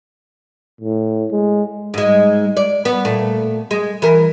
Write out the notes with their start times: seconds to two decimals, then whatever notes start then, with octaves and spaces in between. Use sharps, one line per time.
0.81 A2
1.31 G#3
1.94 G#2 G#3
2.57 D5
2.85 B3
3.05 A#2 A3
3.71 G#3
4.02 E3 A#4